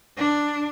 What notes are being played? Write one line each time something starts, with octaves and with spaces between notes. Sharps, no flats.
D4